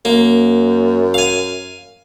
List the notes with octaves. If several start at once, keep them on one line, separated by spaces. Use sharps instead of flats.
F#2 A#3
F5 G#5